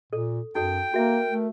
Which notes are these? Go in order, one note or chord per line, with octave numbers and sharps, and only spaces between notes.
A#2 A4
F#2 D#4 F#4 A4 G5
A#3 F#4 A#4 E5
A3